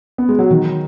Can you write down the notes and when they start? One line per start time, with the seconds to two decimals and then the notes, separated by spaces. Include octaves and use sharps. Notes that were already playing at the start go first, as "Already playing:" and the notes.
0.18 B3
0.29 G#3
0.39 F#3
0.51 D#3